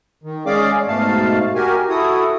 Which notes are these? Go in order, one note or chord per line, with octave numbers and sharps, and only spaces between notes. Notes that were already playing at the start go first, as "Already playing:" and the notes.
D#3
G#3 C#4 G#4 D5 F5 D6
G#2 B2 A3 F5 A5
F#4 G4 A#4 G#5
E4 F#4 A4 D#6